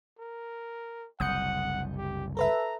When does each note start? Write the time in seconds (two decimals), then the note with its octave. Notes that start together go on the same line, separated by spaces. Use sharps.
0.19 A#4
1.20 F#1 C2 F#5 D#6 G6 C#7
1.96 G4
2.37 A4 B4 E5 A#5